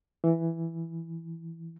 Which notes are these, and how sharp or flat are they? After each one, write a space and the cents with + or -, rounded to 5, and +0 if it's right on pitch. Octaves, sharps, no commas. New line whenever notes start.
E3 +5